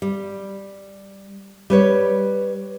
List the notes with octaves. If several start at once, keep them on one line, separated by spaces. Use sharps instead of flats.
G3
G3 B4 C#5